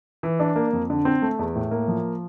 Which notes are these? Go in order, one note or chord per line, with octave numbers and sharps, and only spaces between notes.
E3
D4
A#3
F2
D3
C4
A3
E2
A2
A#3
F3